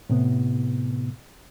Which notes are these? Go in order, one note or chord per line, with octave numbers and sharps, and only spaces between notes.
A2 C3 B3